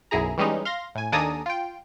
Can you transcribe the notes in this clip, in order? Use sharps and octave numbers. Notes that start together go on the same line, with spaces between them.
B1 F#2 E4 G#4 A#5
E3 G3 G#3 C#4 D#4
F5 C6 A#6
A2 G#5
D#2 D4 A4 G#5 A#5 D#6
F4 G5